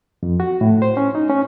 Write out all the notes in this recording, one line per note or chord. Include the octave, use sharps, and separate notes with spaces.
F2
F#4
A2
C5
C#4
D#4
C#4